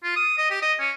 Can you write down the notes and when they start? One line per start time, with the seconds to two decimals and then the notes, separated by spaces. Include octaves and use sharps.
0.04 F4
0.16 D#6
0.38 D#5
0.50 G4
0.62 D#5
0.79 C#4